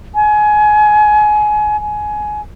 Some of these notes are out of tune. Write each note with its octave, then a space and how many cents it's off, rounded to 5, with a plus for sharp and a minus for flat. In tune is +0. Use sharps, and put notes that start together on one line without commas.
G#5 +25
G#5 +20